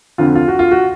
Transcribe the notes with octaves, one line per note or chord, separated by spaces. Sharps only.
F2 D3 F4
F4
F#4
F4
F#4